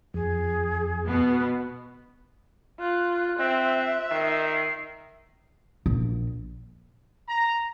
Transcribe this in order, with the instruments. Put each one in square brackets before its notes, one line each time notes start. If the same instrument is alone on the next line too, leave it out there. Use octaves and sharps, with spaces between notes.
[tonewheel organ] F2 [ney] G#4
[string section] B2 B3
[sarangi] F4 [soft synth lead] F#6
[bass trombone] C4 [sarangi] E5
[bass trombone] D#3 [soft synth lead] C7
[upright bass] A#1
[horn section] A#5